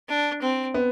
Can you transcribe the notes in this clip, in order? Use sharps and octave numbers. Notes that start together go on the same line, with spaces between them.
D4
C4
B3